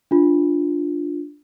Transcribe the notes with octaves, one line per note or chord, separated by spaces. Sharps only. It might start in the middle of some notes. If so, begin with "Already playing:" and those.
D4 F4